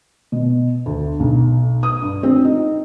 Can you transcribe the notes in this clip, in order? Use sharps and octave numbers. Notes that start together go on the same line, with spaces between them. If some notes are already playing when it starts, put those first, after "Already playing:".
B2
D2
B1
D#6
G2
C4
D#4